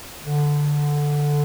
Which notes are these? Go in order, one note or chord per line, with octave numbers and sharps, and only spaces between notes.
D3